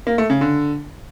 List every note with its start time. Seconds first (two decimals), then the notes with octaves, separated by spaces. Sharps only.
0.07 A#3
0.18 A3
0.30 C#3
0.41 D3